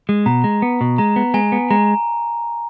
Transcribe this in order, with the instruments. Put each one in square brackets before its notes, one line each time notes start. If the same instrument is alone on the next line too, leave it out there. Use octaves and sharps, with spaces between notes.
[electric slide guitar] G#3
[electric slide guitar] B2 [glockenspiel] A#5
[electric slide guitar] G#3
B3
B2
[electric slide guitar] G#3 [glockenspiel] A#5
[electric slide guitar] B3
[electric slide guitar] G#3 [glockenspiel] G#5
[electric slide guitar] B3
[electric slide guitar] G#3 [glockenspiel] A#5